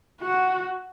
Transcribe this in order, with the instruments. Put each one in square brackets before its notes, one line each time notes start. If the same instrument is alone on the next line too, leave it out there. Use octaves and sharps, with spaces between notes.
[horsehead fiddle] F#4